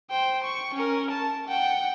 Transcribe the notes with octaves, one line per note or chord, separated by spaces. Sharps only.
C5 G5
C#6
C#4 A#4
A5
F#5 G5